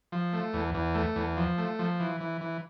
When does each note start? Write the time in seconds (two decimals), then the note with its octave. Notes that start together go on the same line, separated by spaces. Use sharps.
0.12 F3
0.33 A3
0.53 E2
0.74 E2
0.95 A3
1.16 E2
1.37 F3
1.58 A3
1.79 F3
2.00 E3
2.21 E3
2.41 E3